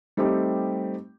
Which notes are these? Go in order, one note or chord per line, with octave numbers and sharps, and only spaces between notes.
G3 A3 C4 D#4 G4